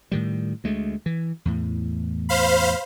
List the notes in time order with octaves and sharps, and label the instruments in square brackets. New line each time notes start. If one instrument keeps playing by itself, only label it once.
[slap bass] A2 D#3 G3
D2 G#3 A3
E3
E2 A2
[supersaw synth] C5 F5 B5